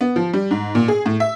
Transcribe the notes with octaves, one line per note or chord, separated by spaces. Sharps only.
B3
F3
G3
G#2
A#2
G#4
A2
E5